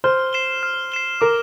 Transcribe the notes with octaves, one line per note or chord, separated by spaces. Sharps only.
C5 F6
C7 E7 G7
F6
C7 E7 G7
A#4 D6